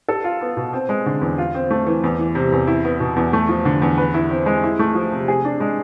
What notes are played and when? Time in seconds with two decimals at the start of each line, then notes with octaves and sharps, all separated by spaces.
0.09 A4
0.24 F4
0.41 B3
0.57 B2
0.73 C4
0.89 G#3
1.06 D3
1.21 E2
1.38 F4
1.54 C4
1.70 A3
1.86 E3
2.04 E2
2.19 E3
2.35 C3
2.52 E2
2.67 E4
2.84 B3
3.00 B2
3.16 E2
3.33 A3
3.49 F3
3.65 D3
3.82 E2
3.98 B4
4.14 E4
4.30 C4
4.46 G#3
4.63 E4
4.79 A3
4.95 F3
5.12 C3
5.28 G#4
5.45 D4
5.60 G#3